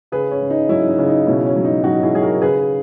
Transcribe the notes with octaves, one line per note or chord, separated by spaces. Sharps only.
C#3 G#4 B4
C#4
C#3
D#4
F#3 C#4 E4
D#4
C#3
D#4
B2 C#4 E4
C#4
F#3
D#4
F#3 D#4 F#4
E4 G#4
F#3 G#4
F#4 A#4
C#3 G#4 B4